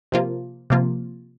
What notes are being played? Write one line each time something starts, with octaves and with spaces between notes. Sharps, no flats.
C3 F3 A#3 F4
C3 F3 A#3 F4